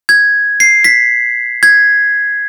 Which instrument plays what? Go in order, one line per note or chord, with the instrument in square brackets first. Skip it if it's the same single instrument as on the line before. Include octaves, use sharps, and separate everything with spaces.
[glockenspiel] G#6
C7
B6
G#6